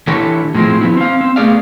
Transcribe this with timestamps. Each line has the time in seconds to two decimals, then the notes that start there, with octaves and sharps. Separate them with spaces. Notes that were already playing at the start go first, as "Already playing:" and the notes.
0.07 D3 E3 E4 G4 A4 C#5
0.55 A2 F3 G#3 C4
0.81 F3 B3 E4
0.97 C4 F5
1.21 C4
1.36 A3 B3 G#4 D5 F5